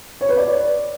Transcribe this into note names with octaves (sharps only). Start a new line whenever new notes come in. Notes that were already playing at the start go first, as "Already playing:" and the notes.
C#5
B4
D5